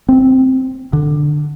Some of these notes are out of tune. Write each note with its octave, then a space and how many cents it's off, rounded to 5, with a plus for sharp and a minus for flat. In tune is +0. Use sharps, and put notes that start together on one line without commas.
C4 +0
D3 +10